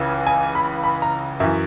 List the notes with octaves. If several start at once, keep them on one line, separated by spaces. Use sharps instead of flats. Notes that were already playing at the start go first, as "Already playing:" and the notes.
Already playing: C#2 C#3 E3
G#5
B5
B5
A#5
F#2 E3 E5